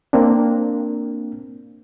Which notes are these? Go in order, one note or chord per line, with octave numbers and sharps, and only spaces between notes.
A#3 C4 D4